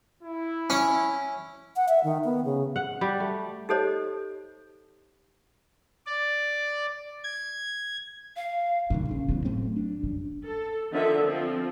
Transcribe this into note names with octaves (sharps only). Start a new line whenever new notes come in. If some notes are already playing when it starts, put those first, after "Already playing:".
E4
C#4
F#5
E5
D#3
B3
C#3
F#5
G3
A3
D#4 G4 A4 C5 C#5 D#5
D5
G#6
F5
F#1 G2 A#2 D#3
A#1 C#3
F#1 E2 F#3
A2 A3 C4
D4
F#2
A4
D3 D#3 F3 D#5 E5
F3 C4